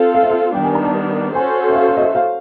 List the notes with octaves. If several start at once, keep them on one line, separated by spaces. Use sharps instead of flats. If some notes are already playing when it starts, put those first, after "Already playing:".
Already playing: C4 F4 A4
F5
E5
F5
D#3 G3 B3 D4 G5
G#5
A#5
A5
C#4 F#4 A4 C5 G#5
E5
F5
F5
D#5
E5
F5